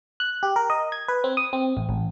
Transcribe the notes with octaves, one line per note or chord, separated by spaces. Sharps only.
F#6
G4
A#4
D#5
G#6
B4
C4
D#6
C4
A1
A1